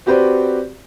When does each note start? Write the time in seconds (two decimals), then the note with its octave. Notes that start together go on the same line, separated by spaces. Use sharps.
0.06 C4 F#4 G4 B4 C5 D5